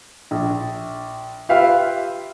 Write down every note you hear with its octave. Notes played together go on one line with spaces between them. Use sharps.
A#1
F4 G4 B4 E5 F5 G5